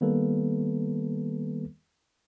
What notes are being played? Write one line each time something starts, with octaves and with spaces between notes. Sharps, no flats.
D#3 G3 A#3 B3 A4 B4